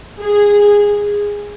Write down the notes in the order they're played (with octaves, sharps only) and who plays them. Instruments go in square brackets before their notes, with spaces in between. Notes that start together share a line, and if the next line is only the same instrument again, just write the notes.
[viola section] G#4